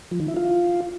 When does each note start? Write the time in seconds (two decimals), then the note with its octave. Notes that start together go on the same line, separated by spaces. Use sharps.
0.11 F3
0.20 D#3
0.28 E4
0.37 F4